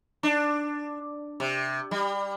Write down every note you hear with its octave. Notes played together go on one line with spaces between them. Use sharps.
D4
C3
G3